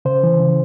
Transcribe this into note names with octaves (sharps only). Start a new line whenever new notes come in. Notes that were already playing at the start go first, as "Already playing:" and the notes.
C#3 C5
E3
C#3